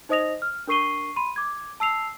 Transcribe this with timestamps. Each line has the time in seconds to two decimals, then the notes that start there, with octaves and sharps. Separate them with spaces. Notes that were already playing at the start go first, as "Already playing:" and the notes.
0.09 D#4 C5 D#5 D#6 A#6 F7
0.42 F6
0.67 D4 A#4 C#6 C7 D#7 G7
1.16 B5 C6 D#7
1.36 D6 G#6
1.80 A5 E6 C7 F7